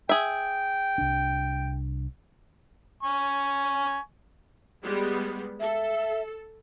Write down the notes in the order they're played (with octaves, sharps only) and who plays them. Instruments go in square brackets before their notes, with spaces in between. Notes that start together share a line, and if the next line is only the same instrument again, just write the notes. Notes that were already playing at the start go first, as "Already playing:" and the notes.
[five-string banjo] G#4 E5 [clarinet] G5
[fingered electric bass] C2 D4
[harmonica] G#5 C#6
[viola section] G3 G#3 B3
[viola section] A4 [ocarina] E5